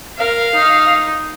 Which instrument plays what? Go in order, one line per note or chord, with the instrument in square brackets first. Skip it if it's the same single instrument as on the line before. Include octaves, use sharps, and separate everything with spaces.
[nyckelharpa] A#4 [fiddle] F5
[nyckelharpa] D#4